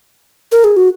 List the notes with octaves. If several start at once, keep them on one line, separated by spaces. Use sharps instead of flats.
A#4
G#4
F#4